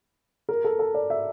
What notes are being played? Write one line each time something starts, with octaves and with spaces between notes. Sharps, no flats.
A#4
A4
A4
D5
E5